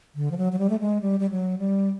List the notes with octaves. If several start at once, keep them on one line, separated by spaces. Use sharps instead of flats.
D3
F3
F#3
F#3
G3
A3
G#3
G3
G3
F#3
G3